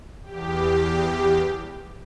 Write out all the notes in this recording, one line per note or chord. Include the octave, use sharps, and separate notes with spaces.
E2 G4